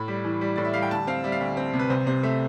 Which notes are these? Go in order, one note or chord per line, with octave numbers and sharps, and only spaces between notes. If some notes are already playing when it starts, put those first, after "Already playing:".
Already playing: A2 B5
G3
E3
G3
A2 D5
E5
G3 F5
G5
D2 A5
C4 F5
G3 E5
F5
D2 E5
C4
C3
B4
C2 C5
C3 C5
A3 E5